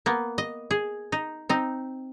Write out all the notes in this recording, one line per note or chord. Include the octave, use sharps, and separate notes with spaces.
A#3 B3
D#5
G#4
D#4
C4 D#4